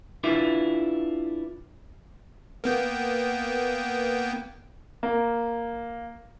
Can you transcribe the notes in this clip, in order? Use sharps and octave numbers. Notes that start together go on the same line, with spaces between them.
D4 E4 F4 B4
A#3 B3 G5
A#3